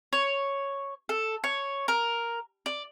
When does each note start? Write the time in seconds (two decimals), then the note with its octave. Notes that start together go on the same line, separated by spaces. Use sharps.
0.13 C#5
1.09 A4
1.44 C#5
1.88 A#4
2.66 D5